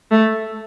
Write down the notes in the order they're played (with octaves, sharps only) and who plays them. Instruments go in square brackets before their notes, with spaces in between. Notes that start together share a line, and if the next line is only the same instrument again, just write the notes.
[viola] A3